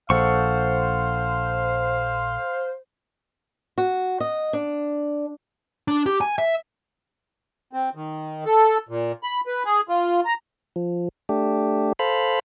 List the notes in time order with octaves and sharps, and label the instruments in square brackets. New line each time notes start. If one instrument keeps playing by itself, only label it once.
[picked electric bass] A#1 [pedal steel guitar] A4 F#5 C#6 [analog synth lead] C5 [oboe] F5
[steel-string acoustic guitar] F#4
D#5
D4
[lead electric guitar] D4
G4
G#5
E5
[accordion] C4
D#3
A4
A#2
B5
B4
G#4
F4
A#5
[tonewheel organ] F3
A3 D4 G4
A4 C5 F5 B5